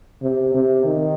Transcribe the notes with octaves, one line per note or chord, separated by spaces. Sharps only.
C3
C3
D#3